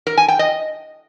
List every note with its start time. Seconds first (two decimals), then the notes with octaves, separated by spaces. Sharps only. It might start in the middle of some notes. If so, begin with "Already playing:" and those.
0.07 A#4
0.17 G#5
0.28 G5
0.39 D#5